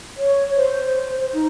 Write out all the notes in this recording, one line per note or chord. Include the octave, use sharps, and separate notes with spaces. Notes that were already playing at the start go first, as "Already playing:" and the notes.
C#5
C5
D#4